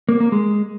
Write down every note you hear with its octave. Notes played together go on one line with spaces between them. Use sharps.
A#3
A#3
G#3